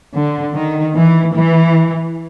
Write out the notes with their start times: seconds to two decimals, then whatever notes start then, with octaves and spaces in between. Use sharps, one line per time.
0.13 D3
0.54 D#3
0.95 E3
1.35 E3